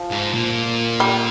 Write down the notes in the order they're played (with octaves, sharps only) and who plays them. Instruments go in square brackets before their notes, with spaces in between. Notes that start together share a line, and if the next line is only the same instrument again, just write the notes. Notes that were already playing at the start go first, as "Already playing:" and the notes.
Already playing: [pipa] F3
[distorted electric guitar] G#2
A#2
[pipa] G3